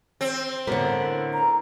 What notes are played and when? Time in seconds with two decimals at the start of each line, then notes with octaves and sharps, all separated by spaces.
0.21 C4
0.67 A2 D3 B3 E4 A#4
1.33 A#5